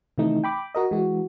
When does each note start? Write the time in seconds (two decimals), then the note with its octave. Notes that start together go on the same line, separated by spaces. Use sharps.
0.18 C3 D#3 E3 A3 D#4
0.44 G5 B5 D6
0.75 F#4 A#4 D#5
0.91 E3 G#3 F#4